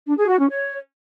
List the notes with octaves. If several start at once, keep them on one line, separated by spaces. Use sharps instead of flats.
D4
G#4
F#4
C#4
C#5